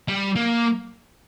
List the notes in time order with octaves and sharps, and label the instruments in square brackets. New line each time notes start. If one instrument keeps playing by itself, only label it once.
[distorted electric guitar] G3
A#3